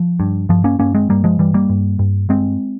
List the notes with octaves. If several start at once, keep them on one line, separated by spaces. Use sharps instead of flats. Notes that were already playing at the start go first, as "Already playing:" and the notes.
Already playing: F3
G2
G2 F3
A#3 C#4
G2 A#3 C#4
G#3 C4
G2 G3 A#3
F3 G#3
G2 E3 G3
G3 A#3
G2
G2
G2 G#3 C4